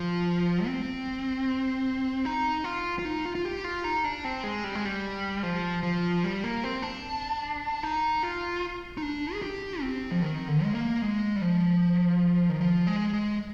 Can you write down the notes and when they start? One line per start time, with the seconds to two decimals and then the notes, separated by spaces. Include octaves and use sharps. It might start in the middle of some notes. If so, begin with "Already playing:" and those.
Already playing: F3
0.66 C4
2.25 D#4
2.64 F4
2.99 F4
3.05 D#4
3.25 F4
3.35 F4
3.45 G4
3.64 F4
3.84 D#4
4.04 D4
4.24 C4
4.44 G#3
4.64 G3
4.75 G#3
4.85 G3
5.43 F3
5.83 F3
6.24 G3
6.44 A#3
6.64 C4
6.82 D4
7.83 D#4
8.23 F4
8.97 D#4
9.02 D4
9.33 G#4
9.42 G4
9.81 C4
10.11 F3
10.22 D#3
10.48 D3
10.63 G#3
10.75 A#3
11.02 G#3
11.36 G3
11.41 F3
12.49 D#3
12.61 F3
12.87 G#3
13.13 G#3